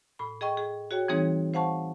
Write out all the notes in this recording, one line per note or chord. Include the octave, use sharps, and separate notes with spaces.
A2 B5
G#4 D#5 G5 C#6
G#4
F#4 G#4 C#5 G5
E3 G3 C4 D#4 G#4 C#5
C5 F5 F#5 A5 C#6